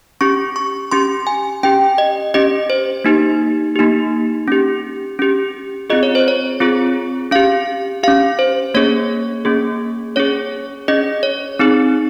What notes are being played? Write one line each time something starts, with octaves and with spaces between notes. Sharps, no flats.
C#4 G4 C#6
C#6
C#4 G4 C6
G#5
C#4 G4 G5
D#5
C#4 G4 D#5
C5
A#3 D#4 G4
A#3 D#4 G4
C#4 G4
C#4 G4
C4 F4 G#4 D#5
C#5
C5
C#5
C4 F4 G#4
C#4 G4 F5
C#4 G4 F5
C5
A#3 C#4 G#4 C#5
A#3 C#4 G#4
C#4 G#4 C#5
C#4 G#4 D#5
C#5
C4 D#4 G#4